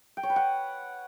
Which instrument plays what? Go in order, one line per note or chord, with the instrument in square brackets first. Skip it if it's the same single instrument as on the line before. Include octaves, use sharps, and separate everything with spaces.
[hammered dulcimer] G5
C#5
B4
F#5